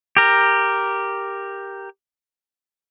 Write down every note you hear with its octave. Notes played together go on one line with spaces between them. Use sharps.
G4 A#4